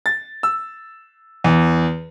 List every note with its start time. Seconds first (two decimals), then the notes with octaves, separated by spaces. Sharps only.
0.06 A6
0.43 E6
1.44 E2